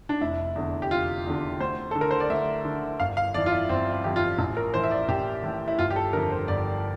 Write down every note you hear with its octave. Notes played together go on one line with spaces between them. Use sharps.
D4
F1 E4
E2 D3
G4
F1 F4
E2 D3
D2 C5
D3 A4
A#4
C5
D5
D2 E5
D3
G1 F5
F5
F2 E3 D5
F4
E4
G1 C4
E4
F2 E3 G4
F4
A1
A#4
A2 E3 C5
E5
D5
A1 G4
A2 E3
E4
G1 F4
G4
A4
F2 D3 A#4
C5
G1 D5